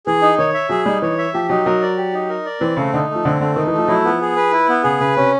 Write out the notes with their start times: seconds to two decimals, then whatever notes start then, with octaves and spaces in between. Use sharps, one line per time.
0.06 E3 G#4
0.22 D#4
0.38 D#3 C#5
0.54 E5
0.69 F#3 G#4
0.86 G3 D#4
1.02 E3 C#5
1.18 E5
1.34 F3 G4
1.49 F#3 D#4
1.65 F#3 A#4
1.82 D5
1.97 G4
2.13 D#4
2.29 A#4
2.45 D5
2.61 E3 C4
2.77 C#3 A3
2.94 D3 D#4
3.10 A3
3.15 F3
3.25 D3 C4
3.41 D3 A3
3.56 D#3 D#4
3.67 E3
3.72 A3
3.78 F3
3.88 F#3 E4
4.04 F3 B3
4.21 G#4
4.36 B4
4.52 E4
4.69 B3
4.84 C#3 G#4
5.00 C#3 B4
5.16 C3 C#4